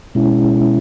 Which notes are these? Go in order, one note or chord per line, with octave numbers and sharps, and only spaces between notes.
B2 G#3 C#4 E4